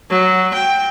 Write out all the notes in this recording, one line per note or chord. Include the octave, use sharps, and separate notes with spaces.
F#3
G5